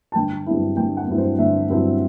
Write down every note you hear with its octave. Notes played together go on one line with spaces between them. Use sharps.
A5
G1 G5
G2 F#3 C4 E4
G1 G5
F#5
G2 F#3 C4 E4
C5
G1 E5
G2 F#3 C4 E4